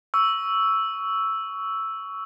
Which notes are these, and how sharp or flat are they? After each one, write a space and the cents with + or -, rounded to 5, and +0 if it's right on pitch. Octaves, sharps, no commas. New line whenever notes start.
C#6 +15 E6 +0